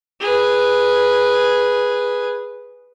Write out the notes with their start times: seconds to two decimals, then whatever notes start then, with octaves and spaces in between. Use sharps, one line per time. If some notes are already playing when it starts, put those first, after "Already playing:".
0.21 G#4 B4